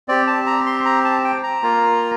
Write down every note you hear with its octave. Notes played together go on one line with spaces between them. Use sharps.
C4 G4 D5
A5
A#5
C6
A#5
A5
G5
A#5
A#3 F4